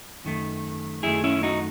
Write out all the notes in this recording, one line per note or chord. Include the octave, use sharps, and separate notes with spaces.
F#2 D#3 A3
F#2 D#3 A3 E4 G#4
C#4 E4
D#4 F#4